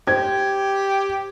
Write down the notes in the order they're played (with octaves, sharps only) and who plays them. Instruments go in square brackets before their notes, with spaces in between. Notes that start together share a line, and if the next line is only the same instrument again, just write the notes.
[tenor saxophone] G4 [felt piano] C5 G#6